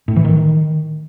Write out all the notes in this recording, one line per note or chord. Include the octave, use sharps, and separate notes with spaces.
A2
E3
D#3